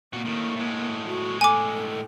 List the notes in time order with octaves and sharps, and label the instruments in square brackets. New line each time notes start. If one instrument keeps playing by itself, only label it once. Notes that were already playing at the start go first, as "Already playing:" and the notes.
[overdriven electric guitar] A#2 F#4 [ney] A#3
[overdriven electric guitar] A2 D#3
A2 G#3
[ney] F#4
[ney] A4 [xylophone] G#5 D6